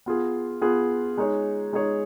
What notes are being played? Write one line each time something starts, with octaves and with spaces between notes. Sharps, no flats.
B3 F4 G#4
B3 F4 G#4
G#3 D#4 G#4 C#5
G#3 D#4 G#4 C#5